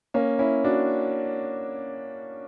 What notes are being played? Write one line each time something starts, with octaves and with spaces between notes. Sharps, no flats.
A#3 C#4
C#4 E4
D4 F#4